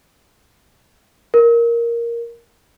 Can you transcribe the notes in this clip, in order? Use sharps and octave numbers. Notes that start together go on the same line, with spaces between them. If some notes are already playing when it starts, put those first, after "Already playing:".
A#4